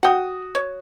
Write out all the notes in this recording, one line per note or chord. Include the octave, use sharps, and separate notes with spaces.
F#4 F#5 G5 D#6
C#5